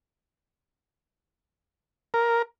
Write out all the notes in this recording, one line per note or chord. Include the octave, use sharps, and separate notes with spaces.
A#4